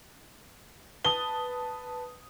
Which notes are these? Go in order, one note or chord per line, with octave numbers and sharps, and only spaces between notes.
B4 A5 D#6 G7